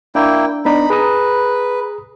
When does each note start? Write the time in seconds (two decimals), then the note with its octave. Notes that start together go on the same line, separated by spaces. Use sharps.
0.15 A#3 D4 E4 G5
0.65 B3 D4 D#4 B5
0.90 G#4 B4 A#5 D#6